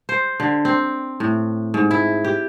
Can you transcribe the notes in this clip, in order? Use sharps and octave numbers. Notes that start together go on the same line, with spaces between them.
C5
D3
C4
A2
G#2
E4
G4